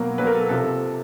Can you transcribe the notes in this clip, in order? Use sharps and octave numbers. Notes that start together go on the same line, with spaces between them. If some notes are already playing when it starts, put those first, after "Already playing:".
Already playing: B2 F#3 A#3 A#4
B2 F#3 A#3 B4
A#4
A4
C3 F3 A4